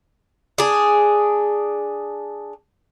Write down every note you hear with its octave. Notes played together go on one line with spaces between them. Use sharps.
D4 G#4